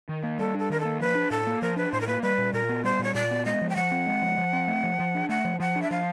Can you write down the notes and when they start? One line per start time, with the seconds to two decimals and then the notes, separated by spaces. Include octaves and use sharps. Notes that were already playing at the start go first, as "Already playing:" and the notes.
0.09 D#3
0.23 A#3
0.39 G3 A4
0.55 D4 A4
0.70 D#3 A#4
0.80 A4
0.85 A#3
1.00 F3 B4
1.15 D4
1.31 A2 A4
1.47 A#3
1.62 F3 A#4
1.76 D4 B4
1.92 A2 C5
2.01 A#4
2.07 A#3 B4
2.23 G3 B4
2.38 A#2
2.53 A#2 A#4
2.69 B3
2.84 G3 C5
2.99 A#2 C#5
3.15 A#2 D5
3.31 B3
3.45 G#3 D#5
3.62 F3
3.69 G5
3.76 F3 F#5
3.91 C4
4.07 G#3
4.22 F3
4.38 F3
4.53 C4
4.68 A3
4.83 F3
4.99 F3
5.15 D4
5.29 A3 F#5
5.45 F3
5.60 F3 F#5
5.76 D4
5.82 E5
5.91 F3 F5